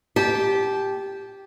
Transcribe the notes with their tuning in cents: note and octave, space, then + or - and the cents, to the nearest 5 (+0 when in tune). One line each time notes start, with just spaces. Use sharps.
G4 +0 A5 -25